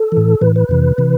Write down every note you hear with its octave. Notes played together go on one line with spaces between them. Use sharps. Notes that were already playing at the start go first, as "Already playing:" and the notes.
Already playing: A4
A2 E3
A2 E3 B4
B4
F2 C3 E3
C3 E3